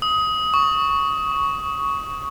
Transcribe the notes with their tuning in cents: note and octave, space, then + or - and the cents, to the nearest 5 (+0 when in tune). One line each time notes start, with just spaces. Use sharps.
D#6 +20
C#6 +10
C#6 +15